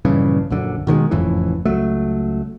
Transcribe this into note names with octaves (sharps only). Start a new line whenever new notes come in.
A#1 G2 C#3 E3
A#1 F#2 D3
B2 D#3 F#3 G#3
F#1 F2 A2 E3
C#2 F#3 A3